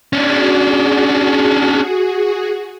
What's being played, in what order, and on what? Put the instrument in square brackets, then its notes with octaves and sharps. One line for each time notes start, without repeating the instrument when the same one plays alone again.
[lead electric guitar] C#4 D4 [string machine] F#4 G#4